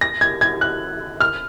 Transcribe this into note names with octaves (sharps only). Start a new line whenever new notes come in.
A#6
G#6
G#6
F#6
F6